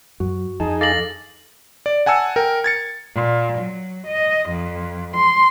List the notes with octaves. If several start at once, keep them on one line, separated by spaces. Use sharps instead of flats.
F#2 F#4
F2 D#4 G#4 A5
A4 F5 D6 A6 A#6 F#7
D5
F#5 G#5 A5 E6 C#7
A#4 G5
G#6 A6 C#7
A#2
F#3
D#5
F2
C6